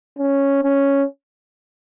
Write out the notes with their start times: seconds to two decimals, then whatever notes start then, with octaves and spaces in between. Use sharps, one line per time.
0.18 C#4
0.63 C#4